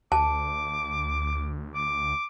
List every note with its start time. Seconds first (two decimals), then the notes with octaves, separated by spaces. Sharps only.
0.12 D2 A5 D6
1.74 D6